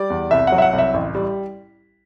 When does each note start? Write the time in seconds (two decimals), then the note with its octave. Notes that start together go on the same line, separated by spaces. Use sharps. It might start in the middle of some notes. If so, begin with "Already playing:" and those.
Already playing: G3 D5
0.10 E2
0.31 C2 E5
0.47 F#3 F#5
0.58 E5
0.62 F#5
0.73 C2
0.78 E5
0.94 A1
1.15 G3